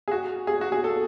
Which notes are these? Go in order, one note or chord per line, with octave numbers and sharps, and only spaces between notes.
G#4
F#4
G#4
F#4
G#4
A4